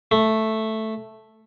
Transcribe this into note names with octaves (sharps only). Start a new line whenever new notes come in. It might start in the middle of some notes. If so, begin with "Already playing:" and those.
A3